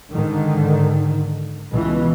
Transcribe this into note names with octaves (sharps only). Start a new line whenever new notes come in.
G#2 D3 D#3
C#2 B2 E3